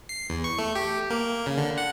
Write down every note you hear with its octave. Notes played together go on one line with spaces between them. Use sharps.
C7
E2
C#6
A3
G4
A#3
C#3
D3
F#5